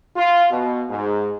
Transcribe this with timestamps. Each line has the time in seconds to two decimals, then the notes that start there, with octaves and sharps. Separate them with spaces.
0.16 F4
0.51 B2
0.90 G#2